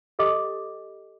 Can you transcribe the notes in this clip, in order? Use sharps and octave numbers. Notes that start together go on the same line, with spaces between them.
G4 A4 D#5 D6